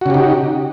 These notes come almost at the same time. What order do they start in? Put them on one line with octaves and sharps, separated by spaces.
F#4 C#3 G4 D#4